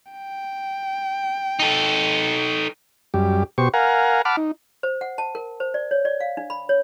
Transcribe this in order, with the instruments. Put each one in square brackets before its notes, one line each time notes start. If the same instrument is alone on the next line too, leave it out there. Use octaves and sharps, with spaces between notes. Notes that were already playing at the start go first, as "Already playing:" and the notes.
[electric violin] G5
[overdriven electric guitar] D#4 A4
[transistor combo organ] F#2 G3 G4
B2 G4 C5 C#6
A#4 F5 F#5 G#5 A#5
F#5 A5 B5 D6 F6
D#4
[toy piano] C5
F#5
A5
A#4
C5
D5
C#5
D5
F5
D4
B5
C#5